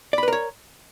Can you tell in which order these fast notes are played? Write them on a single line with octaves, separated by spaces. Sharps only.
D5 B5 B4 A#4 C#5